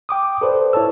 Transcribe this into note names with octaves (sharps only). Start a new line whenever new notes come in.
G5 D6 D#6
A4 B4 C5 D5
E4 C#5 A5 E6